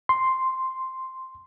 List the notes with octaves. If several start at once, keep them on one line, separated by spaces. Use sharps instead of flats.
C6